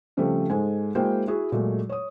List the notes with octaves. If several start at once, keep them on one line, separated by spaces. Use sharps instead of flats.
C#3 F3 G3 A3 C4
G#2 G#3 A4 G#5
G#3 A#3 E4 F#4 C5 G5
E4 F#4 G#4
A#2 F#3 G#3 A3
C#5 D#6